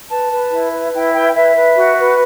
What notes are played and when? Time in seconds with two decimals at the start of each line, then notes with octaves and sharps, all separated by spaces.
0.08 B4 A5
0.30 B4
0.50 E4
0.71 B4
0.92 E4 G5
1.12 B4 G5
1.34 B4 E5
1.55 B4
1.76 F#4
1.96 B4